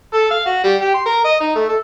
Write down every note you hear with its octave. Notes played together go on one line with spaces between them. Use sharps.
A4
F5
F#4
G3
G4
C6
A#4
D#5
D#4
A3
A4